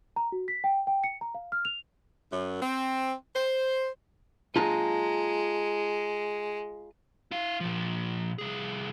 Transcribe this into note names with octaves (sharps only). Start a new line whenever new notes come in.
A#5
F#4
B6
G5
G5
C#7
A#5
F5
F6
F7
F#2
C4
C5
G#3 F4 A5 A#5
E4 F5
A#2 F3
C2 G#4